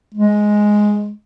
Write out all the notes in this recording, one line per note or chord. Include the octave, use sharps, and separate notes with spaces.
G#3